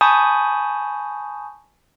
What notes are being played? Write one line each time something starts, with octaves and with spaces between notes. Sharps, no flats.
G#5 A5 B5 C#6 D#6 G6